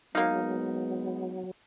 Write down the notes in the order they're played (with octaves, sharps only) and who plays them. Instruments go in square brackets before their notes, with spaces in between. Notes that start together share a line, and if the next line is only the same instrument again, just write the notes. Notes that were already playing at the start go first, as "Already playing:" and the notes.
[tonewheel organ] F#3 [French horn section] G#3 B3 [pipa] A#3 F5 [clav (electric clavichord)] D#4